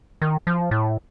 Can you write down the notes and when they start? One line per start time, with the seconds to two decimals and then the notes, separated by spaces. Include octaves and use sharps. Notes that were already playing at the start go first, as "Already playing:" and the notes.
0.22 D#3
0.47 F3
0.71 A2